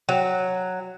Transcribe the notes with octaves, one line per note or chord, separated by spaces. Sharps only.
F#3